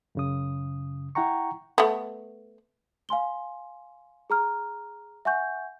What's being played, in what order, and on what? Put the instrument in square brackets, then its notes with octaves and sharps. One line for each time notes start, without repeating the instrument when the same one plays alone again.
[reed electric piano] F#2 C#3 D#6
E4 F#5 G5 A#5 C#6
[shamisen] A3 B3
[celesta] F5 G#5 C6 G7
G#4 A#5 F6
E5 F#5 G#5 C#6 G6